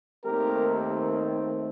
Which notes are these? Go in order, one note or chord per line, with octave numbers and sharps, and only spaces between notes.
D#2 D#3 A3 C4 G4 A#4